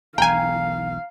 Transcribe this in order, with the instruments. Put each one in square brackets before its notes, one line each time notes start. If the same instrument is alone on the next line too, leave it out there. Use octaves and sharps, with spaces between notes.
[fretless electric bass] E1 B1 E2 [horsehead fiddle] F5 [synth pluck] G5 G#5 [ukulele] A#5